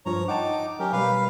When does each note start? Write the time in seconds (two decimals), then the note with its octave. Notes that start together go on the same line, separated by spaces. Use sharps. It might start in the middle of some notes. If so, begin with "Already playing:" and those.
0.06 G2 F3 C#5 A#5
0.28 D#4 F#5 G5 A5 D6
0.80 F#3 C#4 G4 A#4
0.92 B2 G3 B4 F5